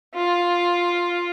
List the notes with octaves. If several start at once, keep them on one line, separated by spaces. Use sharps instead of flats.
F4